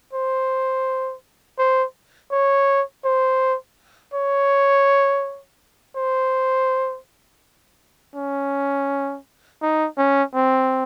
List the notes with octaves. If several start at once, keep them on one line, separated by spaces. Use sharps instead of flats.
C5
C5
C#5
C5
C#5
C5
C#4
D#4
C#4
C4